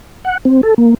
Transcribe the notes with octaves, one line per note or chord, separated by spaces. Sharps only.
F#5
C4
A4
A#3